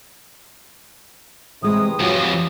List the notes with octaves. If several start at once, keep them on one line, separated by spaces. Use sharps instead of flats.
C3 E3 G3 G#3 C4 D#6
F2 E3 F#3 F4 G4